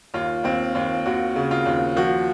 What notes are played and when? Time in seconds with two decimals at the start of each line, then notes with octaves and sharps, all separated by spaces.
0.14 D#2 F4
0.44 D#2 C4
0.75 D#2 F4
1.06 D#2 F#4
1.36 C#3
1.51 F4
1.66 D#2
1.97 F3 F#4